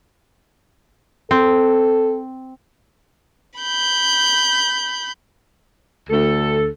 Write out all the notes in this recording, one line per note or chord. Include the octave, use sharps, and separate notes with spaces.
C4 A4
B5 G6
D2 A4